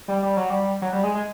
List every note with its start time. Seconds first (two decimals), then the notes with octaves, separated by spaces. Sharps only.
0.08 G3
0.23 G3
0.37 F#3
0.50 G3
0.82 F#3
0.93 G3
1.03 G#3
1.15 G#3